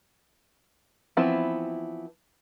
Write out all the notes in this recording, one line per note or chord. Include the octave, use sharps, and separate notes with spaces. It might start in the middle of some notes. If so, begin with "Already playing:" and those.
E3 F3 B3 C4 E4